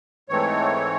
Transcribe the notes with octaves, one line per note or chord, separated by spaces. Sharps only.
G#2 E3 A3 C4 C#5